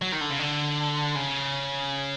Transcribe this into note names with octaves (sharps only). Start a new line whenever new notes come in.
F#3
D#3
D3
C#3
D3
C#3